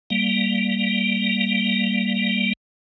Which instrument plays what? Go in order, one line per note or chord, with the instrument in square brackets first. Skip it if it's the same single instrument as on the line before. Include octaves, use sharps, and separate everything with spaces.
[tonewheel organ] G3 A#3